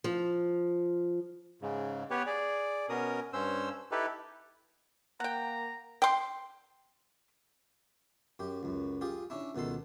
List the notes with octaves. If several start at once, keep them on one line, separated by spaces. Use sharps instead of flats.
F3
G#2 C#3
B3 G4 B4 C#5
G#4 D5
B2 C#4 A#4 D#6
G2 C#4 C5 E6
D#4 E4 G4 A4 B4
A#3 F#5 G5 A#5
G5 C6
F#2 G4
C#2 F#2
F4 G4 G#4
C#4 D4 E4
C#2 B2 D#3 A4 C6